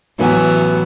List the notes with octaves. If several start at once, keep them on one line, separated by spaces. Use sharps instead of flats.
A1 E3 F#3 B3 G#5